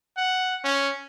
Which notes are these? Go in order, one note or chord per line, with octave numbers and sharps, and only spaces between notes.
F#5
C#4